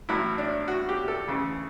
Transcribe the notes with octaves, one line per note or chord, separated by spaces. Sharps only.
A1 A2 F#3 E4
D4
F#4
G4
A4
D2 C#3 E3